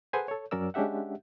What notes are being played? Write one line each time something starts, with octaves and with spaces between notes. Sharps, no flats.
G#4 A4 B4 C5 F#5 G#5
A4 C#5
F#2 F#3 C#4 A#4 D5 E6
G#3 C#4 D4 G4 E5 F#5